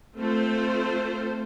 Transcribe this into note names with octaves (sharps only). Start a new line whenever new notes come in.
A3 C4 F4 A4 C5